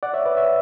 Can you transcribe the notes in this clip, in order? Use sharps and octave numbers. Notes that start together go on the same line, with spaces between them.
D5 F#5
C#5 E5
B4 D5
C#5 E5